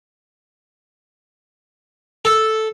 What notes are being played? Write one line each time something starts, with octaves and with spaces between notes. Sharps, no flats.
A4